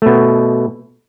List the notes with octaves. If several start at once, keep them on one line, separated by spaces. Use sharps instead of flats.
B2 A3